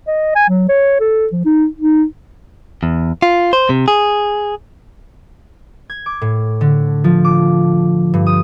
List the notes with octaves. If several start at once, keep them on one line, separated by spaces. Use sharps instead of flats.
D#5
G#5
F#3
C#5
A4
F3
D#4
D#4
E2
F4
C5
C3
G#4
G#6
D6
A2
D3
F3
D6
G2
D#6